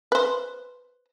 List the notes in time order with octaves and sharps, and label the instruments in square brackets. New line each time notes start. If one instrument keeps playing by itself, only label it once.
[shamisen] B4 C5